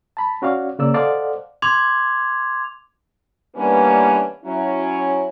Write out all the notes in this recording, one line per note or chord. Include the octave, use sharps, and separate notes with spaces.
A5 B5
C#4 F#4 D5 F5
C#3 A#3 D5 E6
A4 C5 D5 D#5 F5 F#5
C6 D6 G#6 F7
E3 G3 A#3 B3 C#4 D4
F#3 C#4 E4